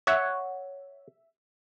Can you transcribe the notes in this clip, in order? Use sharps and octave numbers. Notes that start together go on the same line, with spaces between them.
C#5 E5 F#5